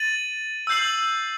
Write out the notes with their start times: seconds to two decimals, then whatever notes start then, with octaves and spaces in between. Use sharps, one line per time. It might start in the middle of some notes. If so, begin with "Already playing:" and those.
Already playing: A6 D#7 F#7
0.67 E6 G6 C7 F#7